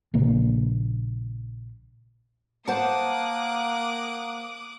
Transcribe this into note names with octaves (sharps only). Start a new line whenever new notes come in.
A#1 C#3 A#3
A#3 C5 F#5 A5 D6 D#6 F#6